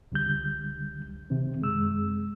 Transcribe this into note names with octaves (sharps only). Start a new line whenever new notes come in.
C#2 D3 G3 G6
C3 D#3 C4
F#2 G#3 E6